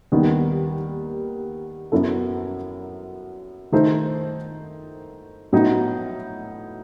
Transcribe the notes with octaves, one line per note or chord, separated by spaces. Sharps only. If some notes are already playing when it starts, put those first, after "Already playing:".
D#2 D#3 G3 B3
F#2 F#3 B3 E4 A4
D#3 A3 D#4 A4 C5
A2 F#3 B3 D#4